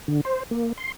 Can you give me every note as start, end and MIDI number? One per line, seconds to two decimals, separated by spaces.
0.08 0.21 50
0.25 0.43 72
0.51 0.73 58
0.78 0.92 84